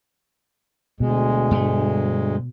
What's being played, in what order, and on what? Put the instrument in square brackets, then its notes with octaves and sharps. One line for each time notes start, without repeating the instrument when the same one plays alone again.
[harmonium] D2 G#3 [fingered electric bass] B2
[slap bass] G2 A3